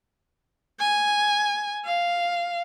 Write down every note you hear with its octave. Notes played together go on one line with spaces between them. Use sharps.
G#5
F5